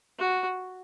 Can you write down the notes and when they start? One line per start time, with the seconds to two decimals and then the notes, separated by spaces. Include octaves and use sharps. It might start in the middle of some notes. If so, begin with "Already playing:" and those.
0.19 F#4